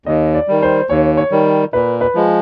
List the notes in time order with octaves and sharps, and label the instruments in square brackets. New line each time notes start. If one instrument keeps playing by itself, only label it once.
[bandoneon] D#2 [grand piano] D#5
[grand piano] D5
[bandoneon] D#3 G3
[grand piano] C5
[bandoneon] D#2 [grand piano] C#5
[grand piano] C#5
[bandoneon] D#3 G3
[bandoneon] A#2 [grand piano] B4
[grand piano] B4
[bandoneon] F3 G#3